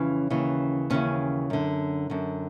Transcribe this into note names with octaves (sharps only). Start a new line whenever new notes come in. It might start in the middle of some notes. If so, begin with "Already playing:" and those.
Already playing: F2 C#3 E3 C#4
D#2 C#3 E3
D#2 C#3 E3 C#4
F#2 D3
F#2 D3